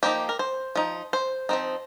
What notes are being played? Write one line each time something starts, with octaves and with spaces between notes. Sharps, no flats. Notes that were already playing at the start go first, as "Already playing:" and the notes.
F3 A#3 D#4 G4
A#4
C5
F3 D#4
C5
F3 C4 D#4